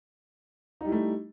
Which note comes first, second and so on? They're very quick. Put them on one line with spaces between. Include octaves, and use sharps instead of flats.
D#4 G3 E4 A3